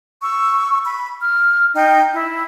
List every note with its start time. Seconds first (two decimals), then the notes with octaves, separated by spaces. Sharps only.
0.22 C#6 E6
0.84 B5
1.21 F6
1.74 D#4 G5
2.13 E4